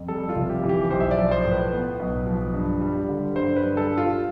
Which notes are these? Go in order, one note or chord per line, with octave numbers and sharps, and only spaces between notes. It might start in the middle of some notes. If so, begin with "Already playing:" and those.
Already playing: F2
G3 A4
F4
F1
G4
E3
G4
B1 C5
E5
D5
F3
C5
A2
B4
B3
B1
F3
G2
G3
D3
G2 C5
B4
G2
A4
G3
F4